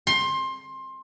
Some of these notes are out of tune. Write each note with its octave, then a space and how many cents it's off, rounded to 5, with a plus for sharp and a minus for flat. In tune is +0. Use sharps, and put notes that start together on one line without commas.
C6 +20